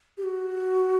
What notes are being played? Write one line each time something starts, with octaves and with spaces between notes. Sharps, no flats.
G4
F#4